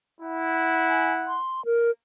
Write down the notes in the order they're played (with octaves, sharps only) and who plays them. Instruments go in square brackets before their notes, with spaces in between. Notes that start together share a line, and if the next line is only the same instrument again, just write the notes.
[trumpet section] E4 F#5
[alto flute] G#5
C6
A#4